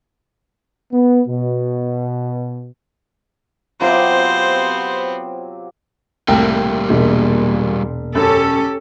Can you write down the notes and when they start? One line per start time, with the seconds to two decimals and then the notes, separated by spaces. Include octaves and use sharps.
0.92 B3
1.28 B2
3.81 C3 F#3 B3 C4 F4 G4 C5 D6
6.28 C2 A2 G3 A#3 G5
6.90 E1 A#2
8.15 F#2 C#4 G4 A4